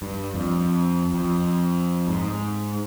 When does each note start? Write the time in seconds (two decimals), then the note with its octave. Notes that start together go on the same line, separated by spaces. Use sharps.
0.02 G2
0.34 F2
1.13 F2
2.08 G#2